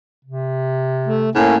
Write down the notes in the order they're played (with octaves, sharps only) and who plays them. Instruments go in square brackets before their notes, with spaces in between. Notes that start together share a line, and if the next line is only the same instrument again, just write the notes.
[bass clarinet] C3
[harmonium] A3
[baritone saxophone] A2 [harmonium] A3 A#3 C#4